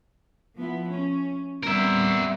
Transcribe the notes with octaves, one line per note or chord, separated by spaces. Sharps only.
F3 B3 E4
C#4
G3 B3 C4 A#4 E5